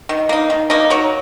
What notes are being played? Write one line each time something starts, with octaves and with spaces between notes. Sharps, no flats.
D#3
A#3 D#4
D#3
A#3 D#4
F#3 A#4 C#5